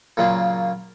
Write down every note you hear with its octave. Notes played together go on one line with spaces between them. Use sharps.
A#2 C#3 F#3 A#3 F4